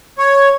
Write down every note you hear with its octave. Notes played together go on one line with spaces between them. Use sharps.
C#5